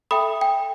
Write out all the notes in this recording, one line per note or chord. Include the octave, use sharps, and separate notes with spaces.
A4 E5 G5 B5 D#6
G5